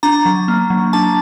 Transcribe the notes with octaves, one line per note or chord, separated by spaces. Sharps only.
D4 A#5
F#3
A#3
F#3
D4 A5